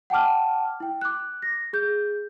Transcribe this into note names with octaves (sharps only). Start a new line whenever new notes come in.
F#5 G5 A5 D6 F6
E4 G5
D6 F#6
A#6
G#4 G6